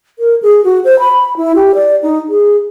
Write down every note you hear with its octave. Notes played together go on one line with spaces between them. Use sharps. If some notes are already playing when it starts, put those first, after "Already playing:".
A#4
G#4
F#4
C5
B5
E4
G4
D5
D#4
G#4